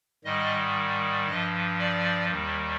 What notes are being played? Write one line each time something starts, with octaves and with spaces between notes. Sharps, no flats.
G#2 D#3 G3 D#5
G2 F3 D#5
D5
D#2 D#3 G3